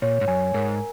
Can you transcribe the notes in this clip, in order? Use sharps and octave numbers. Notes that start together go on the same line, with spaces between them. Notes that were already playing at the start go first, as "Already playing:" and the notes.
A#2 C#5
G#2
F#2 G#5
G#2 A#4